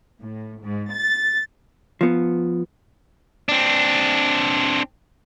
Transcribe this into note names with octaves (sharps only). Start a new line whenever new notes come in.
A2
G#2
A6
F3 B3
C4 D4